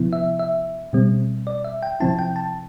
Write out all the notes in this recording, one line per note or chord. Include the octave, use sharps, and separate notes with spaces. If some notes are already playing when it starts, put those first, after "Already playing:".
Already playing: C3 F3 B3 E4
E5
E5
B2 G3 C4
D5
E5
G5
C3 F3 C4 E4 A5
G5
A5